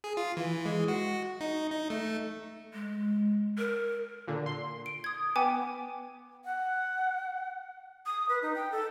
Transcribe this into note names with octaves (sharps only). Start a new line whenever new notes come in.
G#4
F4
E3
G#3
F#4
D#4
D#4
A3
G#3
A#4
A#2 D3
C6
D7
D#6 G#6
B3 G5 G#5 D6
F#5
D#6
B4
D#4
G5
A4